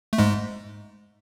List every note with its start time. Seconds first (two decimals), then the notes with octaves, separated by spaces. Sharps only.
0.13 A3
0.18 G#2 G#3